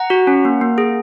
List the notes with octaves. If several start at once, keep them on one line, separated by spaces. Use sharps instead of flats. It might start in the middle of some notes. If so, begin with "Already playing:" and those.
Already playing: F#5 A#5
F#4
C#4
A#3
A#3
G#4